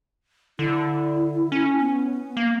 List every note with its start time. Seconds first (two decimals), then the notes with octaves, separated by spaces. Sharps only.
0.59 D3 E4
1.52 C#4
1.80 B3
2.37 A#3